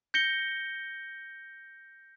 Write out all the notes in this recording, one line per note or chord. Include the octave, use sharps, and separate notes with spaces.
G6 A#6 C#7 G7